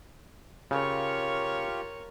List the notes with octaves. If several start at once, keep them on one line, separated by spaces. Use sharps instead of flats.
C#3 F4 G4 A#4 C#5 C#6